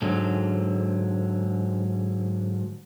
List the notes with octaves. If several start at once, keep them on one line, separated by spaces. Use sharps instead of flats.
G#2 D3 F#3